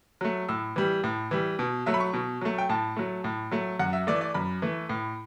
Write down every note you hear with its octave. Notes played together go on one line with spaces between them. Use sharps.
F#3 A3
A2 E6
E3 G3
A2
E3 G3
B2
F#3 A3 E5
B5
C#6
B2
F#3 A3
G5
A2 A5
F#3 A3
A2
F#3 A3
F#2 F#5
E5
E3 A3 D5
D5
F#2 B5
E3 A3
A2